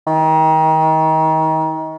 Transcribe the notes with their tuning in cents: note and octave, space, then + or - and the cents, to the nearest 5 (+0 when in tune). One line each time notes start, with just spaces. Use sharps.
D#3 +30